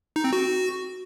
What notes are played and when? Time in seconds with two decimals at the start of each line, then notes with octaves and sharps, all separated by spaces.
0.16 D#4
0.24 C4
0.33 F#4